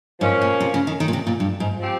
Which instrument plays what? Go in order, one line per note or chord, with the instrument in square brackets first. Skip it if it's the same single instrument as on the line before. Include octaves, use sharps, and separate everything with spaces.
[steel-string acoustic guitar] G#2 [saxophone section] F3 A#3 C#4
[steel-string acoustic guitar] A#2
C3
C#3
D#3
D#3
A#2
C3
A#2
G2
G#2
[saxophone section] F3 C4 G4